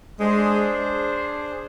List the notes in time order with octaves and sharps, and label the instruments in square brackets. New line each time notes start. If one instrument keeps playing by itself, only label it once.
[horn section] G#3 [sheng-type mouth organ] D4 G#4 C5